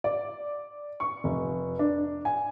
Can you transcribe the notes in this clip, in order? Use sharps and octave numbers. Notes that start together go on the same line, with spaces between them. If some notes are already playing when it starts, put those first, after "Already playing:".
D5
C#6
F1
D4
G#5